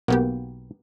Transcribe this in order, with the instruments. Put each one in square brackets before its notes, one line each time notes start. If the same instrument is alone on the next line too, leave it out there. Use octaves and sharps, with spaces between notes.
[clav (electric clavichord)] B1 F#4 F#5 [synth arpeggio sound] A#3 B3 G4